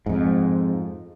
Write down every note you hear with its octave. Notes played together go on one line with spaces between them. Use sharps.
F2 G#2